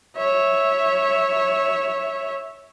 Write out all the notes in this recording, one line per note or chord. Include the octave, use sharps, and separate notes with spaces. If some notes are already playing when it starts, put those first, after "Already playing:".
C#5 E5